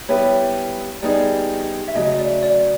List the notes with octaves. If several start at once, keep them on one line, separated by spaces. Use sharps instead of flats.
G3 B3 E4 G4 B4 C#5
G3 B3 D#4 G#4 D5
E5
C#3 F#3 A3 D#5
D5
D5